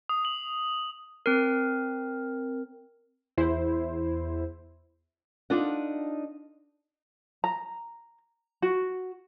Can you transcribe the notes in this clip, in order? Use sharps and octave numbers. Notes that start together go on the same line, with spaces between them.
D#6
F#7
C4 A#4
E2 E4 C5
D4 D#4 F4 A4 F#5
A#5
F#4